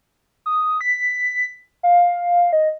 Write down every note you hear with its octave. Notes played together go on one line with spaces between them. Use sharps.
D#6
B6
F5
D#5